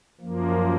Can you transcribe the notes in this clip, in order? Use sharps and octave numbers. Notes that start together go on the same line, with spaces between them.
F#2 F3 A#3